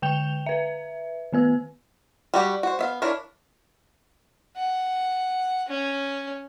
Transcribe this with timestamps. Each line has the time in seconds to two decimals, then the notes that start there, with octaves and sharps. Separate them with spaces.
0.02 D3 G5 G6 F7 G7
0.46 B4 E5
1.33 D#3 B3 B4 E6
2.34 G3 F#4 G4
2.63 F#4 C5
2.79 B3 E5 F5
3.02 D4 E4 F4 A#4 C#5
4.56 F#5
5.68 C#4